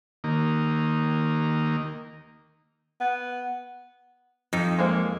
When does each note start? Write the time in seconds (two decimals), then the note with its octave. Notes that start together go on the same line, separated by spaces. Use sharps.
0.24 D#3 A#3
3.01 B3
4.53 F2 F3 D#4
4.79 G#3 A#3 C5